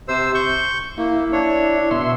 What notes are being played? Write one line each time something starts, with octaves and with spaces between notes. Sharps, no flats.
C3 C5 E6
C#6 G6
A#3 E4
D4 C#5
B2 E5 C6